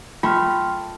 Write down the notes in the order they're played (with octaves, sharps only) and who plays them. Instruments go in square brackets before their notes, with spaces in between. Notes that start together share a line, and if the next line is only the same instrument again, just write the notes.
[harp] A3 [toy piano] F4 [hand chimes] G5 C6 F6